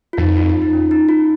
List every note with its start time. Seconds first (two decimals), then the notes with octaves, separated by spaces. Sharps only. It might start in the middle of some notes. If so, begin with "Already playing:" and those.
0.13 F4
0.17 F2 D#4
0.37 F4
0.62 D#4
0.73 C#4
0.91 D#4
1.09 F4